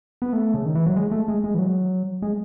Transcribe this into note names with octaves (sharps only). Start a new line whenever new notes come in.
B3
A3
C#3
D#3
E3
F#3
G#3
A3
G#3
G#3
E3
F#3
G#3